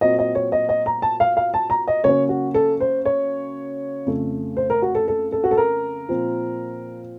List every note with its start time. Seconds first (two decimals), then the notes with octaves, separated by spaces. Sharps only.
0.01 A#2 F#3 C4 D#5
0.19 D#5
0.35 C#5
0.52 D#5
0.69 D#5
0.86 A#5
1.02 A5
1.20 F5
1.37 F5
1.54 A5
1.70 A#5
1.88 D#5
2.04 C#3 F#3 A#3 C#4 C#5
2.29 F#4
2.54 A4
2.80 C5
3.05 C#5
4.06 F2 C#3 A3
4.57 C5
4.70 A#4
4.82 F#4
4.95 A4
5.08 A4
5.32 A4
5.44 F#4
5.51 A4
5.57 A#4
6.09 A#2 F3 C4